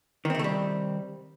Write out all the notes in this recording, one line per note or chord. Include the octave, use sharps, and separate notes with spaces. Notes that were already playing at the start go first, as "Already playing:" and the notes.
C3 D#3 G3 A3 C4